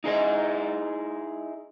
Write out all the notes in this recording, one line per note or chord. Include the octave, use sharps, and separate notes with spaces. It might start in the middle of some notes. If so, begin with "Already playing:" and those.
D#4 E4 G#4 A4 D#5